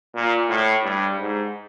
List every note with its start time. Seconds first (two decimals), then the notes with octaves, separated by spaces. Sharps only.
0.15 A#2
0.50 A2
0.84 G2
1.19 G#2